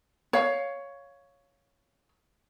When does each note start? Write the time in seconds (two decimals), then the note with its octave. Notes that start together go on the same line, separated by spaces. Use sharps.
0.33 C#5 F5